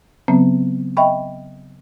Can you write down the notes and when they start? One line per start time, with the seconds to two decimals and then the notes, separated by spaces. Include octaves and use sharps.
0.28 C#3 F#3 B3 C4
0.97 D#5 E5 G5 B5 C#6